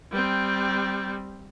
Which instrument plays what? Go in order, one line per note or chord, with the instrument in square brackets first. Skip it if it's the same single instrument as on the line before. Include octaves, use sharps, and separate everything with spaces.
[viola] G3 C4